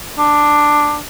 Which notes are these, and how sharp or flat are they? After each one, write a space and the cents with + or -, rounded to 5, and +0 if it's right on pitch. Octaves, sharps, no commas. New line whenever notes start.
D4 +5